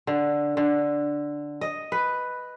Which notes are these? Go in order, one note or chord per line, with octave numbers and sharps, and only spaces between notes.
D3
D3
D#5
B4